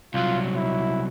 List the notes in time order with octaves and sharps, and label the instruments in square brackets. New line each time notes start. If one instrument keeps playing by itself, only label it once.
[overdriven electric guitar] C2 F#3 [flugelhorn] F4
[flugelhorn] E4